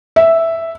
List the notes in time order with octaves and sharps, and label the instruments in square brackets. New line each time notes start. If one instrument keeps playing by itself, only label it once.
[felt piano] E5